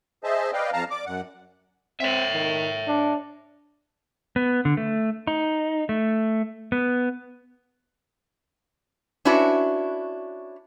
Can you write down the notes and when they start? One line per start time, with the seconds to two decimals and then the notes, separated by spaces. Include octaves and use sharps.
0.24 G#4 C5 D#5 E5 A5
0.53 B4 D5 D#5 F5 G5
0.73 F2 F5 A5 A#5
0.91 D5 D6
1.06 F#2 F#5
2.00 C4 C#5 E5
2.33 D#3
2.87 D4
4.36 B3
4.65 D3
4.77 A3
5.27 D#4
5.89 A3
6.72 B3
9.25 C#4 D4 E4 F#4 B4